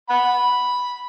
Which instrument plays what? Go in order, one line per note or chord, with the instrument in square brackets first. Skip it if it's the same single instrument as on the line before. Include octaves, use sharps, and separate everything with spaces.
[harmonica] F#5 B5